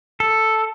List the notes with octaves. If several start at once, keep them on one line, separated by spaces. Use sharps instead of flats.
A4